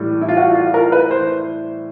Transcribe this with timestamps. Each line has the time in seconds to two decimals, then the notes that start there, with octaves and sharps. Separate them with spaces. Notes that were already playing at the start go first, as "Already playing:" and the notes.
Already playing: A2 E3 G3
0.21 E4
0.29 F4
0.37 F#4
0.55 F4
0.74 A#4
0.92 B4
1.11 C5